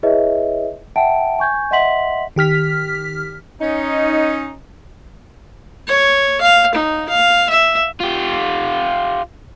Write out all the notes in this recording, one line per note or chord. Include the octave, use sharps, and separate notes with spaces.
E4 G#4 B4 C#5 D#5 E5
E5 F#5 G5 A5 D7
G#5 C#6 G6 G#6
D#5 E5 F#5 C6 B6 F#7
D#3 G4 F6 B6
C#4 D#4
C#5
F5
D#4
F5
E5
F4 G4